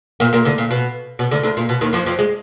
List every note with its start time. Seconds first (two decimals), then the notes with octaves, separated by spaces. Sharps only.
0.20 A#2 A#3
0.33 A#2 A#3
0.45 D2 D3
0.58 A#2
0.71 B2
1.19 B2
1.31 D2 D3
1.43 D2 D3
1.57 A#2
1.69 B2
1.81 D#2 D#3
1.93 F2 F3
2.06 F2 F3
2.19 G#3